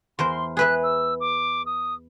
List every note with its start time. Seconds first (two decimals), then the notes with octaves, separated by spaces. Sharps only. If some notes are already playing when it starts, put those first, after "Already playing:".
0.19 E2 A#4 C5 C6
0.57 G#4 B4 E5 F#6
0.83 E6
1.20 D6
1.66 D#6